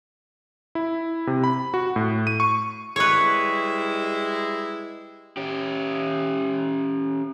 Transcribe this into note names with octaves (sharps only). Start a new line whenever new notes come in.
E4
C3
B5
F#4
A2
D#7
C#6
G3 G#3 E4 B4 C#5
C#4 G4